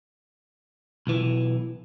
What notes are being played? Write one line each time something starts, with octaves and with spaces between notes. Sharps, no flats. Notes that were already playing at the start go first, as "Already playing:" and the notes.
B1 E3